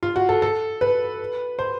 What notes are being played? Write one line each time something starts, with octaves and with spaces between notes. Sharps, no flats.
F4
F#4
A4
A4
B4
C5